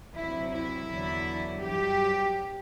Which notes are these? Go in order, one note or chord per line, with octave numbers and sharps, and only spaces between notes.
D2 C3 F#3 E4
E4
E2 D3 F#3
G2 F#3 G4